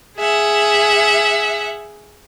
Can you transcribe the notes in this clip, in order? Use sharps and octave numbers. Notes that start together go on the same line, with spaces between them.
G#4 E5 F#5